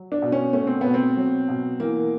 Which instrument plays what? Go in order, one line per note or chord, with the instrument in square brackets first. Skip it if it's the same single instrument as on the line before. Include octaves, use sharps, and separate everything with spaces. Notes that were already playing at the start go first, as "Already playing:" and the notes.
Already playing: [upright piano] F#3
D4
B2
C#4
A3 C#4
C4
B2 B3
C4
F#3
B2
E3 A#3